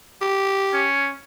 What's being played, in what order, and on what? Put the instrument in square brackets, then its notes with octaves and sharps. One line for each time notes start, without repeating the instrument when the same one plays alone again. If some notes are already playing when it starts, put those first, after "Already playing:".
[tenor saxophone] G4
[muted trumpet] C#4